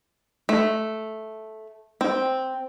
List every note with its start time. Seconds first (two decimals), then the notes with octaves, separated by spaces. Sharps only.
0.49 A3
2.01 C4